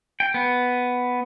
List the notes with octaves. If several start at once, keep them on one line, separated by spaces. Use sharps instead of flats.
G5
B3